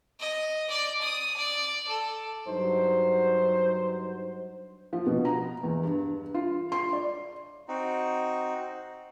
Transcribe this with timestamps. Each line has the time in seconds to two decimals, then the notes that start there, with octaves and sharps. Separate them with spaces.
0.19 D#5
0.68 D5
1.02 D#6
1.36 D5
1.88 A4
2.47 G2 F#3 D#4 C5
4.93 F3
5.06 B2
5.25 A#5
5.63 E2
5.84 G2
6.34 F4
6.72 C6
6.93 D5
7.68 C4 D#4 F#4